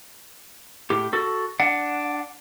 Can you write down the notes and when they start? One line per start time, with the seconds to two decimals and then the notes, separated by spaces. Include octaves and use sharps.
0.90 A2 G4
1.13 F#4 A4
1.60 D4 F#5